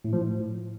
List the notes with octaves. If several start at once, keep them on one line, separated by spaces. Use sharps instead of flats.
A2
F3
A2